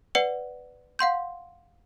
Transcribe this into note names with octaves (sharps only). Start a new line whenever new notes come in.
B4 D5 F#5 C#7
F5 F#5 C6 G6